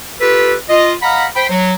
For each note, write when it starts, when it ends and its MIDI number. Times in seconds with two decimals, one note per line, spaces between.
0.21 0.54 65
0.21 0.54 67
0.21 0.54 69
0.21 0.54 71
0.70 0.93 65
0.70 0.93 75
1.03 1.26 75
1.03 1.26 77
1.03 1.26 78
1.03 1.26 82
1.03 1.26 83
1.36 1.50 72
1.36 1.50 79
1.36 1.50 83
1.50 1.75 54